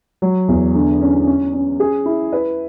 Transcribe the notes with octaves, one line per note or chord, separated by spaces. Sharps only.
F#3
E2
D3
C#4
C#4
C#4
G#4
E4
B4